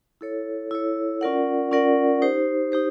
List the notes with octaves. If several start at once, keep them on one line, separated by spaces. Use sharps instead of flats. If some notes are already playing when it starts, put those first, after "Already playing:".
E4 A4 C#5
E4 A4 C#5
C#4 F4 A#4 D5 F#5
C#4 F4 A#4 D5 F#5
D#4 G4 C5
D#4 G4 C5